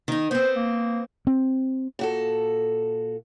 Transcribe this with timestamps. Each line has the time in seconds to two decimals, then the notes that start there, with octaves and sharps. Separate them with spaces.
0.08 D#3 D#4
0.31 B3 C4 C5
0.56 A#3
1.27 C4
1.99 A#2 F#4 A4